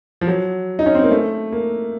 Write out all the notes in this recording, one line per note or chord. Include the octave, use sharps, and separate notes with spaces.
F3
F#3
D#4
C#4
C4
A#3
A3
A#3